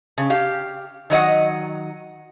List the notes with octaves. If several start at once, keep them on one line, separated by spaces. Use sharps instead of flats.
C#3
G4 F5
D#3 F#3 D#5 F#5